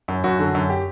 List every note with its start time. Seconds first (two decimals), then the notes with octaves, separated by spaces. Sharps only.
0.08 F#2
0.24 F#2 F#4
0.39 D3
0.55 F#2
0.70 G4